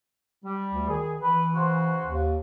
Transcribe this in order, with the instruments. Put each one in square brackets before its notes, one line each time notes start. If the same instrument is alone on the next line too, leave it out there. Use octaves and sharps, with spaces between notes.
[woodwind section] G3
[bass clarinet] D2
[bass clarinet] D#3 [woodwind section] G#4
[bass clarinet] E3 [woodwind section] B4
[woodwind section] C#3 F#4 C5
[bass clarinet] D#2